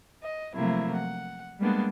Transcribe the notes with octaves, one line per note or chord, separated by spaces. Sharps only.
D#5
C3 F3 F#3 A3 A#3 E4
F#5
G3 G#3 A#3 B3 D4